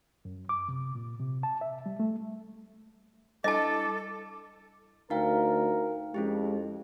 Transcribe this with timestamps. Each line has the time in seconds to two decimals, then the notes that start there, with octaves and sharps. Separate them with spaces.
0.25 F#2
0.49 D6
0.69 C3
0.95 A#2
1.20 C3
1.43 A5
1.61 E5
1.86 G3
1.99 A3
3.44 G3 D4 E4 A4 D#5 A5 D6
5.10 D2 D#4 A#4 F5 G5
6.14 F2 G#3 C#4 E4 G4